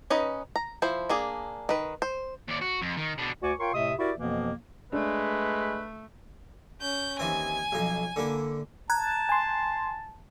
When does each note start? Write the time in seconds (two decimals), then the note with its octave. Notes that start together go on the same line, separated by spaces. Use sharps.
0.10 C#4 D#4 B4 D#5
0.56 A#5
0.82 F3 E4 C5
1.09 A#3 D4 G#4
1.69 D#3 B4
2.02 C5
2.48 D#2 D5
2.62 F#4
2.82 F2
2.97 D#3
3.18 B2 D4
3.42 D2 F#4 D5 G#5 C#6 D6
3.59 F4 A#4 C#5 G5 C6 C#6
3.74 A2 C3 A3 D#5 E5 D#6
3.98 E4 F#4 G4 A#4 D5 E5
4.17 F2 B2 E3 F3 A#3 B3
4.93 G#3 A3 D4 B4
6.81 C#4 G6
7.19 D#2 E3 C4 G#5
7.72 B1 F2 A#5
8.16 D3 A#3 E4
8.90 A5 A#5 F#6 G#6
9.29 G#5 C6